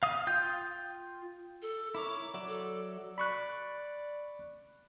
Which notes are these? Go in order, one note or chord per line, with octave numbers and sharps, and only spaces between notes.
F5 D#6
F4 G5 G6
A4
E4 A#4 C#5 D6
F#3 D5 E5
A4
D5 B5 C#6 F#6